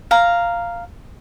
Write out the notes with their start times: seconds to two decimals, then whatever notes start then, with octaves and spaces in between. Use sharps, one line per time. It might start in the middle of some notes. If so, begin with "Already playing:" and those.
0.11 F5 A#5